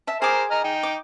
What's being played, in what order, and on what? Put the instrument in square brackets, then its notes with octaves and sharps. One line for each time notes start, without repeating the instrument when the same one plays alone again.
[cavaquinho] E5 A5
[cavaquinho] G#4 D6 [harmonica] A#4 C5
[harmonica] D#5 A#5 F6
D#4 G5
[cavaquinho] D6